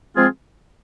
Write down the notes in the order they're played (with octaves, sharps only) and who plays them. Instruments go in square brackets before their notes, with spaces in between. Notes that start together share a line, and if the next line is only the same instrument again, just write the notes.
[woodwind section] F3 G#3 C4 F4 G#4